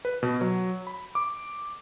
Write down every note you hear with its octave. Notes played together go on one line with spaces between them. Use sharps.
B4
B2
F#3
B5
D6